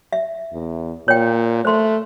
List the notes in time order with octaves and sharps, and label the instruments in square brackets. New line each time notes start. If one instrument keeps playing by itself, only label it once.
[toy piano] E5
[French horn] E2
[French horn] A#2 [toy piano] C#5 G5
[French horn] A3 [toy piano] C5 C6